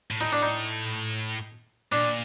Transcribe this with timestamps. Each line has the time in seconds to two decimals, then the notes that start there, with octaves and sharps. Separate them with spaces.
0.11 A2
0.21 D#4
0.32 D4
0.42 D#4
1.92 A#2 D4